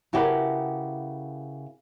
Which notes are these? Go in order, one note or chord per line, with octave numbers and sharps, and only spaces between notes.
C#3 E4 F#4 G4 A#4 B4